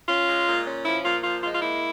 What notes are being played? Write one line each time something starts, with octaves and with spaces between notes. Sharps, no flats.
C#4 F4
G#3
A#2
C#4
F3 E4
A#2 F4
F3 F4
G#3 F4
F4
A#3 E4